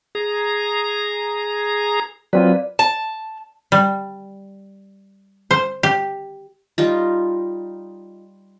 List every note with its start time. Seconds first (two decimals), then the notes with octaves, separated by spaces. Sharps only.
0.15 G#4 A#5
2.33 F#3 C4 F4 B4 D5
2.79 A5
3.72 G3
5.51 C5
5.83 G4
6.78 G3 D#4 F4